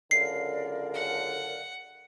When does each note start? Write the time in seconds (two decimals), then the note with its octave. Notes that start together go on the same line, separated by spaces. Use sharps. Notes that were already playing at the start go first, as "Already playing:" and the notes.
0.11 C#2 F#2 D3 A#4 D5 F5 C7
0.94 F#5